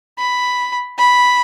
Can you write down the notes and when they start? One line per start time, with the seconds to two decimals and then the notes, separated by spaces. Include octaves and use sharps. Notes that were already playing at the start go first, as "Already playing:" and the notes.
0.19 B5
0.99 B5